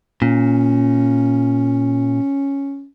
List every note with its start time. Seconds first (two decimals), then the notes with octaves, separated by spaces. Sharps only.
0.22 A#2 C#4